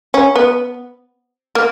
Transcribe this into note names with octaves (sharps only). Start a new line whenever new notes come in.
C#4
B3
A#3